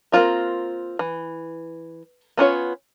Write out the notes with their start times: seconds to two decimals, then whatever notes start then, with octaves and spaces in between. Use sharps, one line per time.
0.12 A#3 C4 D#4 F4 A#4
0.99 E3
2.37 B3 C#4 F4 C#5